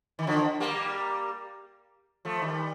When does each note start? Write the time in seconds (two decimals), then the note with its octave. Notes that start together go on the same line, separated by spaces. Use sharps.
0.19 D#3
0.27 D3 F3
0.60 G3 A#3
2.25 F3 A3
2.41 D#3 G3